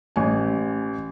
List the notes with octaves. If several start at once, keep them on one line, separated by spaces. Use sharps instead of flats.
A1 G#5